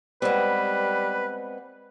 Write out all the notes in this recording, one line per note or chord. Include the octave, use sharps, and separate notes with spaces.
G3 G#3 B3 C4 B4